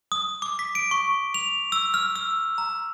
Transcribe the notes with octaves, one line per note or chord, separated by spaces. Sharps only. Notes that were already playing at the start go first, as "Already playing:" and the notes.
D#6
D6
B6
D7
C#6
F7
E6
F6
E6
A#5